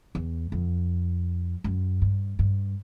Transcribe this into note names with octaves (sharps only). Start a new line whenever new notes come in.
E2
F2
F#2
G2
G2